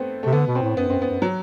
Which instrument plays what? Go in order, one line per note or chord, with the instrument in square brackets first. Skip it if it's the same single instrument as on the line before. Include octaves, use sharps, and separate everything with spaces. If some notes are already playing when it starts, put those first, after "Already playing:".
Already playing: [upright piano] A3 B3 C4
[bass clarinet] C3 [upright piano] A3
[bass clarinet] D3 [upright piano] B3
[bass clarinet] B2
[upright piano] C4
[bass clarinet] A2
[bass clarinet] F#2 [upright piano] B3
[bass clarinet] F#2 [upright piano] C4
[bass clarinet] F#2 [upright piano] B3
[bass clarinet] F#2
[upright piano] F#3